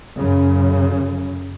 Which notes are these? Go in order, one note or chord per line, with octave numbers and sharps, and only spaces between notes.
F#2 C#3